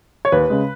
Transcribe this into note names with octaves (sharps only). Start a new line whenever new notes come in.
C#5
D#2 B4
C#3 G#3